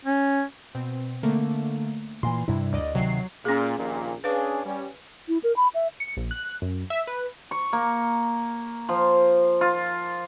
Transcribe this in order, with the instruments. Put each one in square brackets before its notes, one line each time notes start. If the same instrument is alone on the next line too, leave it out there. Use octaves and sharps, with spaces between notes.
[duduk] C#4
[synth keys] B2 C4
D3 A3 A#3
[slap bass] A#2 E3 [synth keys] C6
[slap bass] G2 C3 [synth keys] E4
[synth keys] D2 D5 D#5
[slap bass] C3 D#3 [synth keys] F#3 C7
[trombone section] A#2 [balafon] C#4 G#4
[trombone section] A#1 D#2 A#2
[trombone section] C#4 D4 G#4 [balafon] B4 F5
[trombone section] G3 C#4
[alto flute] E4
A#4
B5
E5
[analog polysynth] C#7
A#1
F#6
F#2
E5
B4
[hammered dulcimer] C#6
A#3
F3
F4